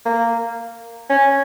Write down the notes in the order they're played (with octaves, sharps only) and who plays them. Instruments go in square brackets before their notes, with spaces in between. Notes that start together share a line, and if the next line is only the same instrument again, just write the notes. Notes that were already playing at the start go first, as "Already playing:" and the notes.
[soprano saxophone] A#3
C#4